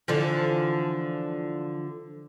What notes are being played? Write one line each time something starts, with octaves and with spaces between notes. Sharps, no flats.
D3 E3 F3